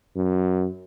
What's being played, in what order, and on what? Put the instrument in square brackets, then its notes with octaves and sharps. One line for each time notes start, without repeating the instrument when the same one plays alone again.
[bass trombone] F#2